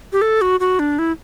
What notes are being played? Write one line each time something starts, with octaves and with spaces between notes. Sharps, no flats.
G4
A4
F#4
F#4
D4
E4